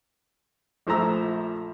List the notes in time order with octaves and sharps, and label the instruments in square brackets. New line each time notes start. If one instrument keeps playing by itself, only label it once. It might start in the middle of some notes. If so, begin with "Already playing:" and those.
[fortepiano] A#1 F3 A3 A#5 E6